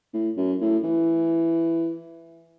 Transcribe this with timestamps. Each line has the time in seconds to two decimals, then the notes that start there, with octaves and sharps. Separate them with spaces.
0.13 A2
0.37 F#2
0.61 A2
0.84 E3